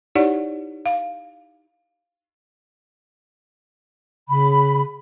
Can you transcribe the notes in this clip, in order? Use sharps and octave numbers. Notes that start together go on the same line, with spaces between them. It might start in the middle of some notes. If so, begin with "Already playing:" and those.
D#4 E4 G4 C#5 D5 F#5
F5
C#3 B5